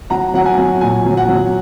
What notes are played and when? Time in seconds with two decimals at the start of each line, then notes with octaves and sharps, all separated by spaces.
0.10 F#3 F#5 A#5
0.34 F#3 F#5
0.46 G#5
0.58 F#3
0.81 A#2 G#5
1.05 F#3
1.17 F#5
1.29 F#3